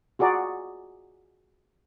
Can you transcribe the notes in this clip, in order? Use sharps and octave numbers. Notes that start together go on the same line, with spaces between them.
F4 F#4 G#4 D5 A#5